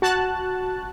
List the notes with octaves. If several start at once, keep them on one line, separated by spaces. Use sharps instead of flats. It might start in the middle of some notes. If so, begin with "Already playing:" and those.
F#4 A5 F#6